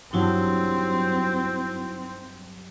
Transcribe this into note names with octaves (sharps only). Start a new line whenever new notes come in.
G2 F#3 C4 D#4 E4 F#4